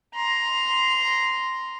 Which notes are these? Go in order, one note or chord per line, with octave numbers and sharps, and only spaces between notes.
A#5 C6